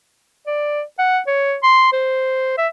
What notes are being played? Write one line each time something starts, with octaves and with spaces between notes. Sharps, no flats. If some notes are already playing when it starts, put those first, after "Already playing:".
D5
F#5
C#5
C6
C5
E5